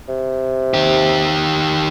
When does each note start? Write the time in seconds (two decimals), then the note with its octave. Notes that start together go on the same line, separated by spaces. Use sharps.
0.08 C3
0.74 D#3 G4